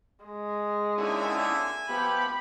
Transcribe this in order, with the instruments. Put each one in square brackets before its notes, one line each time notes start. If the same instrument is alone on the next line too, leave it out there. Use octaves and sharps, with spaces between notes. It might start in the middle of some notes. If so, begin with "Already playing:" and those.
[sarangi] G#3
[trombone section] A#2 D3 [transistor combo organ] C#4 D#4 E4 [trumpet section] E5 G#5
[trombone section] F3 G4 [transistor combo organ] B3 [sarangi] B5